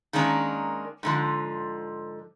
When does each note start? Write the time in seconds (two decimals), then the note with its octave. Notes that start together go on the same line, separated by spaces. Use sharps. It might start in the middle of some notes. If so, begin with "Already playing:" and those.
0.13 D#3 G#3 A#3 C#4 D4
1.03 G#2 D3 F3